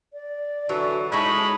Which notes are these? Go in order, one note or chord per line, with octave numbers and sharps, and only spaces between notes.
D5
D3 E3 F#3
G#3 A3 C#4 D#4 E4 A5 B5